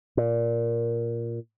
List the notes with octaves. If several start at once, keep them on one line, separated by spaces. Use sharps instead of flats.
A#2